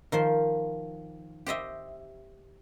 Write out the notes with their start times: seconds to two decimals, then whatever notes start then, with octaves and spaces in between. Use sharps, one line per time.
0.12 D#3 F3 C5
1.46 G4 C5 D#5 E5